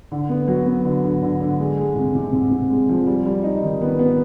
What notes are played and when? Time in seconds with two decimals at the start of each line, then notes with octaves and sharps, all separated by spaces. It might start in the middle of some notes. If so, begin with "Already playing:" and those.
0.12 D3
0.29 B3
0.48 F#3
0.66 B3
0.85 D3
1.04 D3
1.22 D3
1.40 D3
1.59 G#3
1.77 G#3
1.95 C3
2.15 C3
2.33 C3
2.51 C3
2.70 G#3
2.89 F3
3.07 G3
3.25 G3
3.43 D#4
3.63 D#3
3.82 B3
3.99 B3